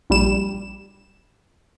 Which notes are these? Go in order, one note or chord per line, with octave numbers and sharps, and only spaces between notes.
A#1 G3 E7